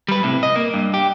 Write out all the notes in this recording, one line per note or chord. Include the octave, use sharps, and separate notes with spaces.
G3 B4
A2 C3
D#5
A#3
G2
G4